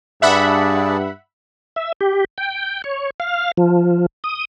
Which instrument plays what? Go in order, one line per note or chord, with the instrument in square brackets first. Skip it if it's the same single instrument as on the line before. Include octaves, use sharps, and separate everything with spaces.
[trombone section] G2 [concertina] D4 G#4 D5 [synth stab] E5 F#5 B5
[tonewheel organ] E5
G4
G5
C#5
F5
F3
D#6